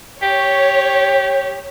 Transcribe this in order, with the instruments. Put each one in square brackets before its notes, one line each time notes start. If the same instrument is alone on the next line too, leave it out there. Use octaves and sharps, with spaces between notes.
[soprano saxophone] G4 [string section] C#5